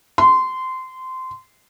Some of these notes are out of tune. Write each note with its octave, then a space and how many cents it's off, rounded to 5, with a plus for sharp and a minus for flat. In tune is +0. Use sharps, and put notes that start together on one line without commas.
C6 -20